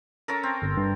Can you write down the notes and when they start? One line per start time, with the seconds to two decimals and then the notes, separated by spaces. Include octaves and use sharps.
0.28 C#4 A4 A#4
0.43 C4
0.62 G1
0.77 G2